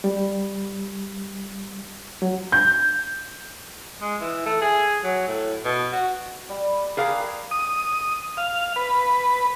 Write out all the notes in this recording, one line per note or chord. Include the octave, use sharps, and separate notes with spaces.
G3
F#3
G6
G#3
E3
A3
G#4
F#3
A2
B2
F#4
G3
G4 G#4 A#4 B4 F5
D#6
F5
B4